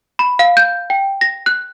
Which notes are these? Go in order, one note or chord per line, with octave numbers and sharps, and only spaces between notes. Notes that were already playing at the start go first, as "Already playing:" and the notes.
B5
F5
G6
G5
A#6
F#6